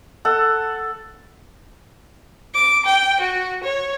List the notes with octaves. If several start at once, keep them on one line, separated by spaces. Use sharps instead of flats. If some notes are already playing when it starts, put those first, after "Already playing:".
A4 F#5
D6
G5
F#4
C#5